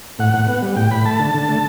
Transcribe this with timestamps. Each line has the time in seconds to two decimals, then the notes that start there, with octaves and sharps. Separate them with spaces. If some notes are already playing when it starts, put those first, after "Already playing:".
0.19 A2 F#5
0.34 A2
0.48 B3
0.62 G3
0.76 A2 G5
0.91 A2 B5
1.06 A3 A5
1.20 D3
1.35 D3
1.49 A3